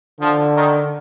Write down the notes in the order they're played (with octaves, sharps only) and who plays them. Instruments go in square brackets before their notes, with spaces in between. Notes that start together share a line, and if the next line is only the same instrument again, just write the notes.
[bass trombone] D3 [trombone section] F3
[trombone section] D#3